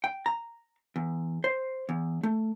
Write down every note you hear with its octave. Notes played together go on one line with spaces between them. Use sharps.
G5
A#5
E2
C5
E2
A3